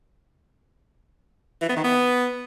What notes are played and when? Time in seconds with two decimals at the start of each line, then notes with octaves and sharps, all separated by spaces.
1.61 E3
1.69 B3
1.76 D#3
1.84 B3